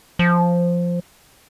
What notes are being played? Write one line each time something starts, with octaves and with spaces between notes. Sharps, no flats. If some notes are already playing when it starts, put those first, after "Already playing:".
F3